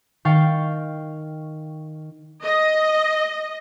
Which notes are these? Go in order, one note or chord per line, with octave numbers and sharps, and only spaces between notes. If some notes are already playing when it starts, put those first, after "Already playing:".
D#3 F5 G5 C#6 A6 C7
D#5